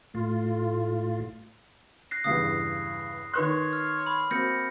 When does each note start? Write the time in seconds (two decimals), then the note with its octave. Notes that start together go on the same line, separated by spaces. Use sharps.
0.15 A2 A3 F4
2.11 F#6 A#6 C7
2.24 E2 G2 C#3 D#6 C7
3.34 D#3 B4 C#5 C6 F#6
3.73 F6
4.07 B5
4.31 A#3 C4 F#4 G6 A#6 C#7